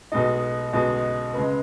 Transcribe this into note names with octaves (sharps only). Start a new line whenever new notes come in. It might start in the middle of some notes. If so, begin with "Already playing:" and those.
B1 B2 G#3 D#4 D#5
B1 B2 G#3 D#4 D#5
C#2 C#3 G#3 B4